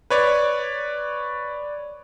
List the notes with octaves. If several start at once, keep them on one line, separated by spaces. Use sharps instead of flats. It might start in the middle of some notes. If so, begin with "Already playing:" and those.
B4 C#5 D5